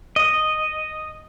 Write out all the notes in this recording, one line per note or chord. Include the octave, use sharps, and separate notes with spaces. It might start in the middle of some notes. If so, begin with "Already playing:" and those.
D#5